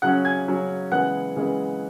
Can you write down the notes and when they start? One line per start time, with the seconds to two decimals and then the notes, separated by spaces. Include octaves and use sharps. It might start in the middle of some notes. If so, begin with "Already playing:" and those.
0.02 C#3 F#3 C#4 F#5 F#6
0.25 G#5 G#6
0.48 C#3 F#3 C#4
0.92 C#3 E3 G#3 B3 F#5 F#6
1.36 C#3 E3 G#3 B3